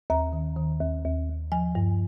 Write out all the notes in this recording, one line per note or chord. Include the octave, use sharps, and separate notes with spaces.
D#2 A#5
D#3
D#3
D#2
D#2
D#2
F3 G#5
G2